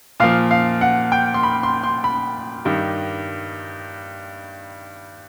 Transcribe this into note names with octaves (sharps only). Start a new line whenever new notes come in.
A#2 F3 F5
F5
F#5
G5
C6
B5
C6
C6
B5
G2 D#3 G3